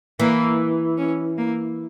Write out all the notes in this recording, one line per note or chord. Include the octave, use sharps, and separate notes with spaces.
E3 A#3
C#4
A#3